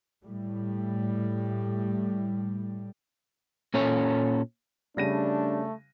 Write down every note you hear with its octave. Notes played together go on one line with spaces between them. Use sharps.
A2 G3
A#2 C#4 A4 C#5
C#3 G3 A3 D4 A#6 D#7